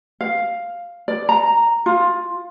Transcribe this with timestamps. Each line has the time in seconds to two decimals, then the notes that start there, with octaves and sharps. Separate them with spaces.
0.21 F5
1.08 D5
1.29 A#5
1.86 F4